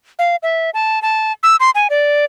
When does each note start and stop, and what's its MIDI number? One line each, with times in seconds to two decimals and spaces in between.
0.19 0.36 77
0.43 0.70 76
0.74 1.02 81
1.02 1.32 81
1.43 1.56 88
1.60 1.70 84
1.75 1.88 80
1.90 2.25 74